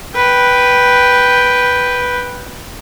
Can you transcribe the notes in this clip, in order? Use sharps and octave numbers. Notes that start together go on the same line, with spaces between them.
B4 G5